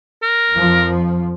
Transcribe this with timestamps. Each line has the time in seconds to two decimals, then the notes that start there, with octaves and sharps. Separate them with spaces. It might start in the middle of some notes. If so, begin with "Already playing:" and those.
0.22 A#4
0.53 F2 F3